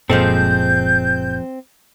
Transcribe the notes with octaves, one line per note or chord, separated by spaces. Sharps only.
F#1 A#2 F3 G#3 C4 A4 G6